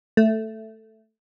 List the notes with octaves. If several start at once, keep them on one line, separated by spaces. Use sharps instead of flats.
A3